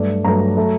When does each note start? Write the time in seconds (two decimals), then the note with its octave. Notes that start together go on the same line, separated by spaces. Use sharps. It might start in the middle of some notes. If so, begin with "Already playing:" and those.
Already playing: G2 F#3 A3 D5
0.24 G2 F#3 A3 A#5
0.57 F#3 A3